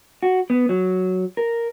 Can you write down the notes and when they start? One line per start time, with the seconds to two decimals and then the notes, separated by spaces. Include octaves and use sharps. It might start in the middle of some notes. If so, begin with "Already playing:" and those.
0.23 F#4
0.50 B3
0.69 F#3
1.37 A#4